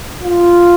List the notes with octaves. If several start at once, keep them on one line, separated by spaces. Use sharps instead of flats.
F4